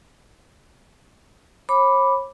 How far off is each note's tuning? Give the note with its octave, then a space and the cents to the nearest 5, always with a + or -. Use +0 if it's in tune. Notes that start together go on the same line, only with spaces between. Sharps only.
C#5 -40 B5 +0 D6 +0